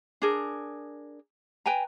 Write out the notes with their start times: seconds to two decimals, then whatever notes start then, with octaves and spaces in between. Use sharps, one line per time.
0.22 D4 G#4 A#4
1.66 B4 G5 G#5 A#5